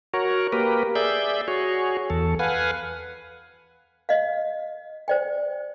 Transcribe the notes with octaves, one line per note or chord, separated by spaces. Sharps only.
F#4 A#4 C#5
A#3 G4 A#4 B4
G#4 D5 E5 G6
F#4 G#4 C#5
E2 A4
B4 F5 F#5 G#5
D#5 F5
C5 D5 G5